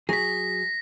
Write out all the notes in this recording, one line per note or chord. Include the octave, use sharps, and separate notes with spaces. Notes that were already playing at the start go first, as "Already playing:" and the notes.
F#3 G#4 A#6 B6